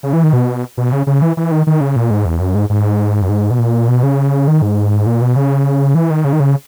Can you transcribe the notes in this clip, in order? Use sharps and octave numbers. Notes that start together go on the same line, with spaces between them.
C#3
E3
D#3
B2
B2
C#3
C#3
E3
E3
D#3
D#3
C#3
A#2
G#2
E2
F#2
G#2
G#2
F#2
G#2
B2
A#2
B2
C#3
D#3
G#2
A#2
B2
C#3
E3
D#3
C#3
D#3
C#3